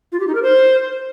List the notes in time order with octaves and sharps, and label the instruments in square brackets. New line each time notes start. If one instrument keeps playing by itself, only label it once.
[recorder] F4
G4
D#4
A#4
C5